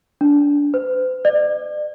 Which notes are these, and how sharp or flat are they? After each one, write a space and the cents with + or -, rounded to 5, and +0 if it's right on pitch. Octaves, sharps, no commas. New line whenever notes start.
D4 -20
C5 -45
D5 +35